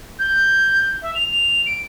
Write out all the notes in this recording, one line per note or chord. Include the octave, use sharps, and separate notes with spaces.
G6
E5
F7
D7